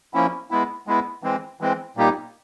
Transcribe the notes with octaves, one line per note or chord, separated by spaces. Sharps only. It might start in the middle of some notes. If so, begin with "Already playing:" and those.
F3 A#3 C#4 E4
G#3 B3 E4
G#3 B3 E4
E3 G#3 C4
E3 G#3 C4
A#2 G3 A#3 D#4 G4